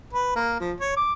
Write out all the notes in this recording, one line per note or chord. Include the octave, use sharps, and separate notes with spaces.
B4
A#3
F3
C#5
D6